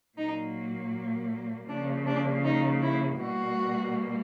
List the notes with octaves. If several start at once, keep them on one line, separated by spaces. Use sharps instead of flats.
A#2 F#3 A#3 D#4
C#3 F3 A#3 D4
D4
D#4
E4
B2 G3 A#3 F#4